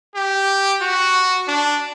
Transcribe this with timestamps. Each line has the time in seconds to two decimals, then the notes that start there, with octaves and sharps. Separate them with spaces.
0.15 G4
0.81 F#4
1.48 D4